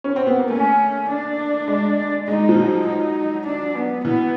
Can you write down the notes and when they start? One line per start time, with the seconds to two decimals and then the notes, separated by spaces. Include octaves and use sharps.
0.04 C#4
0.16 C4
0.27 B3
0.39 A#3
0.50 A3 C#4
1.09 D4
1.68 G#3
2.27 G#3 D#4
2.49 F3
2.56 F#3
2.87 D#4
3.46 D4
3.75 B3
4.04 E3 B3